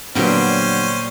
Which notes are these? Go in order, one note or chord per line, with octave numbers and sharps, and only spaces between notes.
A#2 D3 F#3 G3 B3 C#4 C5